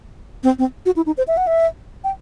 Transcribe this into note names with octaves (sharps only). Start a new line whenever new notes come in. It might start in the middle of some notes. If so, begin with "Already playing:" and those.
C4
C4
F#4
E4
D#4
C5
E5
F#5
E5
G5